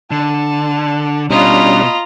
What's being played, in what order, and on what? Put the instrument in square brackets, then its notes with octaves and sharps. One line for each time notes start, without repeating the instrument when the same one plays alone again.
[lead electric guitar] D3 [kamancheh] A5
[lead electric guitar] B2 [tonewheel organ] G3 C#4 D4 [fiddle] F4 A#5 [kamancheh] D#5 B5